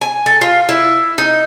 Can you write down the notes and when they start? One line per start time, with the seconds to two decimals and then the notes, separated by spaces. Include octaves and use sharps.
0.01 G#5
0.26 A4
0.41 F4
0.69 E4
1.18 D#4